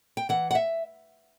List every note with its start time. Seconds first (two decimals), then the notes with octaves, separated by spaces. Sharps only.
0.17 G5
0.29 E3 F#5
0.51 F#5
0.55 E5